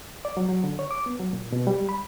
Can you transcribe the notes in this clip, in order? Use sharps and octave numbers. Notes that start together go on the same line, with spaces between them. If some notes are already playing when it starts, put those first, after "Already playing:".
D5
F#3
F#3
D3
C#5
D6
B3
F#3
A#2
B2
G3
B5